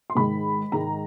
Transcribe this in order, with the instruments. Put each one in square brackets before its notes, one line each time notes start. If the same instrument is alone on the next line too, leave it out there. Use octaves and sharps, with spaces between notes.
[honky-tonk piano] C6
G#2 D#3 G#3 B5
G#2 D#3 G#3 A#5